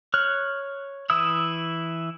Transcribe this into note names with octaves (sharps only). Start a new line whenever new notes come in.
C#5 F6 F#6
E3 E4 D#6 E6